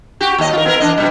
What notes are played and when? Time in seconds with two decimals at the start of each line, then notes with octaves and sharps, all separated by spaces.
0.21 F#4 G4
0.38 D#2 D#5
0.53 F4 A#4
0.66 B3 A#4
0.80 E3 D4 D#5
0.97 B2 G3